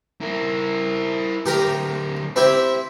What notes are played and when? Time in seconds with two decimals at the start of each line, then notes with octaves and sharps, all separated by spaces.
0.21 E4 A#4
1.46 D3 F#3 G4 A#4 A#5
2.36 C4 E4 G4 E5